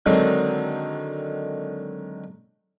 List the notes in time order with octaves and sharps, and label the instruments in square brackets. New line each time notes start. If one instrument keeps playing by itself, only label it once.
[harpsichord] D3 D#3 F#3 G#3 C4 D#4